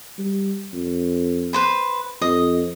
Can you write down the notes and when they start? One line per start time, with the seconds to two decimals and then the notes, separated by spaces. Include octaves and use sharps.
0.18 G3
0.73 F2
1.53 B4 C5 B5
2.22 F2 D#5